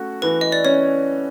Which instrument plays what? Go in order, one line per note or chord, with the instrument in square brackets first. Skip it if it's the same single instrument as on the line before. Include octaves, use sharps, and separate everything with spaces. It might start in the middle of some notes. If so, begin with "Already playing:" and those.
Already playing: [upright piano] A3 C#4 F#4
[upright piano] E3 [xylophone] B4
[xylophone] D#5
D5
[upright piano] C#4 [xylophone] C#5